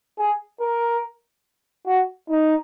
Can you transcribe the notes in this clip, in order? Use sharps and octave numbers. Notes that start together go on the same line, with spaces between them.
G#4
A#4
F#4
D#4